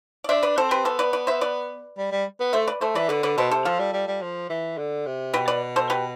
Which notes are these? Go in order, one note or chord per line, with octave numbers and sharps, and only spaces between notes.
D5
D4 C5 E5
B4 D5
C4 A4 C5
G4 B4
B3 A4 C5
B4 D5
B4 D5
C5 E5
B4 D5
G3
G3
B3
A3 C5 E5
B4 D5
A3 A4 C5
E3 B4 D5
D3 B4 D5
D3 B4 D5
B2 A4 C5
C3 A4 C5
F3 F4 A4
G3
G3
G3
F3
E3
D3
C3
B2 G4 B4
B4 D5
A4 C5
G4 B4